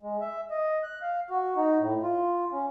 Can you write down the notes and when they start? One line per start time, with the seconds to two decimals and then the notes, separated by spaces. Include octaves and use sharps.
0.03 G#3
0.21 E5
0.50 D#5
0.83 F#6
1.02 F5
1.30 F#4
1.56 D#4
1.80 A2
2.03 F4
2.52 C#4